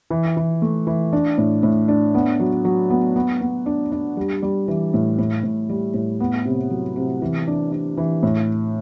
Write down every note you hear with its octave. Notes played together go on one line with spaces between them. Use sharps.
E3
E3
A3
E3
D4
A2
A2
D4
B3
F#3
F#3
B3
B3
B3
D4
D4
G3
G3
E3
A2
A2
A2
G3
A2
B3
C3
F#3
C3
E3
D4
D4
E3
A2